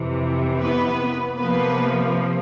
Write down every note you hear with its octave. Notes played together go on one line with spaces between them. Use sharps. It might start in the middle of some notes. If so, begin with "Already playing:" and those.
Already playing: F2 C3 E3
B3 B4
C3 F3 A#3 B3 B4